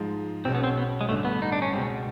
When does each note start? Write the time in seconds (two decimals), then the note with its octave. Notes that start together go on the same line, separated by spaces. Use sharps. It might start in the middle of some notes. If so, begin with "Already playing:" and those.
Already playing: G#2 F3 G#3
0.45 B1 B2 G#3 C4 C#4
0.55 B3
0.64 C4
0.77 B3
1.01 G#3
1.09 A1 G2 D3 A3
1.25 B3
1.42 D#4
1.52 D4
1.62 C#4
1.73 C#2 B2 G#3 C4